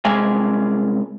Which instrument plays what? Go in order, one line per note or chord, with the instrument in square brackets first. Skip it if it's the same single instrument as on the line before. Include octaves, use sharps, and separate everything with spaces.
[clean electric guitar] C2 C3 G#3 F5 G#5